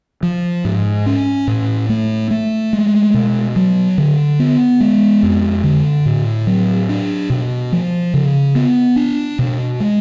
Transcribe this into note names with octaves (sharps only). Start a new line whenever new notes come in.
F3
G#2
C#4
A2
A3
A3
G#3
B2
F#3
D3
B3
G#3
F2
D3
A2
F#3
D4
B2
F3
C#3
B3
D4
B2
G#3